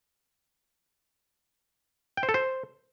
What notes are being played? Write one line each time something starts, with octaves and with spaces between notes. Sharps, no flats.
G5
C5
A4
C5